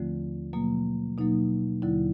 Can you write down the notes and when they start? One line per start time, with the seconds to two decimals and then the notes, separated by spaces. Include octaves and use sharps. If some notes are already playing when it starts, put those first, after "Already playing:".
Already playing: D#2 D3 F3 A3 C4 F4
0.53 B2 F#3 A#3
1.18 B2 F#3 A#3 D#4
1.82 D#2 D3 F#3 E4